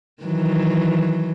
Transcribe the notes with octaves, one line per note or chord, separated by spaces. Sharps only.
D#3 E3 F#3